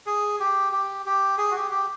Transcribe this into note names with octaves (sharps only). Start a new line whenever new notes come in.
G#4
G4
G4
G4
G#4
F#4
G4
G4